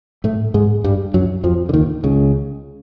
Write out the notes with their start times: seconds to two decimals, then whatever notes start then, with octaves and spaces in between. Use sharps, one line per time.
0.24 A2 A3
0.54 G#2 G#3
0.84 G2 G3
1.14 F#2 F#3
1.44 F2 F3
1.69 D3
1.74 D#2 D#3
2.04 C#2 C#3